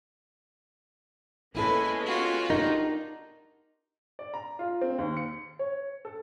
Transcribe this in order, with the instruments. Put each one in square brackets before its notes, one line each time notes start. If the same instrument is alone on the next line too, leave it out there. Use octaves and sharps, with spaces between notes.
[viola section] G#3 B3 C#4 [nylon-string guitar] A#3 E4 A4 [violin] B4 G#5
[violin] F4 F#4
[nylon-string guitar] D4 G4 A#4 [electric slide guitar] D#4
[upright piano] D5
A#5
F4
C4
D#2
C#7
C#5
A4